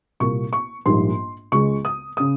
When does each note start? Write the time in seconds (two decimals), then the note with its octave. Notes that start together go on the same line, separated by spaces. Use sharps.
0.20 C2 A#2 G3 A#3 C#6
0.53 C#6
0.86 A#1 G#2 G3 A#3 C6
1.52 C#2 C#3 G#3 C#6
1.85 D#6
2.17 C#3 D#6